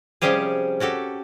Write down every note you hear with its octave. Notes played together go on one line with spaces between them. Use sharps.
C3 F3 G3 C#4 G4 G#4
C#4 F#4 G4 A4